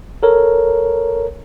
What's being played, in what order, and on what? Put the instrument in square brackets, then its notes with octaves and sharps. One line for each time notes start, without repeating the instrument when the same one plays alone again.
[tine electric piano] A4 A#4 C#5